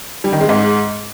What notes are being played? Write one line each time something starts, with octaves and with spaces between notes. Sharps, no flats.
G3
D#3
G#3
G#2